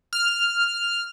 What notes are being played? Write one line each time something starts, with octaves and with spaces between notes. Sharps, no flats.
F6